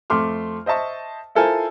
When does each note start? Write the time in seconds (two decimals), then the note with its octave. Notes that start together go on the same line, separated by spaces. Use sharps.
0.10 F2 A3 C6 D6 F6
0.66 C5 D#5 E5 A5 C#6
1.35 E4 F4 A4 A#4 C5 G#5